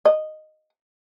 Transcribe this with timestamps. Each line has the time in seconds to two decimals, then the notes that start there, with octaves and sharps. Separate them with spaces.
0.05 D#5